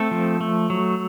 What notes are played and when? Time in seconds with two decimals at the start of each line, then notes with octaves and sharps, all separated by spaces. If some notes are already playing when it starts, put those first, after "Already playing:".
Already playing: A3 C4 A4
0.11 F3
0.41 A3
0.70 F#3